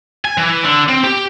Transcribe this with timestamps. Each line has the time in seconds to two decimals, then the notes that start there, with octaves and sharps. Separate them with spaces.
0.25 G#5
0.38 E3
0.64 D3
0.89 C4
1.04 G4